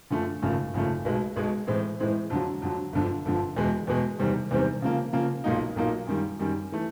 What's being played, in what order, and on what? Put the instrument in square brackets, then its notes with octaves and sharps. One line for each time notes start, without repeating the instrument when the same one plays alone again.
[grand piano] F#2 D3 F3 A3
G#1 F#2 C#3 F3 A3
G#1 F#2 C#3 F3 A3
B1 B2 G#3
B1 B2 G#3
A2 E3 G#3 C4
A2 E3 G#3 C4
F2 D3 F#3
F2 D3 F#3
G1 F2 D3 F3
G1 F2 D3 F3
E2 B2 G#3
E2 B2 G#3
E2 C3 D#3 G3 C4
E2 C3 D#3 G3 C4
C#3 F3 A#3
C#3 F3 A#3
B1 A#2 F#3 A#3 D#4
B1 A#2 F#3 A#3 D#4
F#2 D#3 G3
F#2 D#3 G3
E3 A3